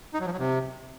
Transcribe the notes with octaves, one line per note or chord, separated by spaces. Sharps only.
D#4
F#3
F3
F#3
C3